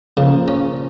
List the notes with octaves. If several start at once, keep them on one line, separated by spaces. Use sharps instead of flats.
C#3 F3 A#3
C#4